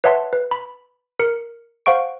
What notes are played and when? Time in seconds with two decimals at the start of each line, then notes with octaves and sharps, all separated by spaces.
0.04 B4 C#5 E5 F#5 A5 C6
0.33 B4
0.51 B5
1.19 A#4 C#7
1.86 C5 F5 F#5 C#6 D7